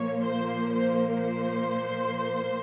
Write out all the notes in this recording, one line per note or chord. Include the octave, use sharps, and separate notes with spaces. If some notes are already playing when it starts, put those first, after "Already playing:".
Already playing: A#2 F3 A#3 C#5
C5
C5
C5